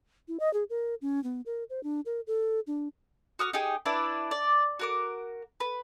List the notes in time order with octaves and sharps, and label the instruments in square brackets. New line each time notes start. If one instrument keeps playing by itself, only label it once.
[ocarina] E4
D#5
G#4
A#4
C#4
B3
A#4
C5
D4
A#4
A4
D4
[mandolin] F#4 D#6 F6
D#4 G4 G#4 G5
D4 E4 B4 D5
D5
F#4 A#4 D6
B4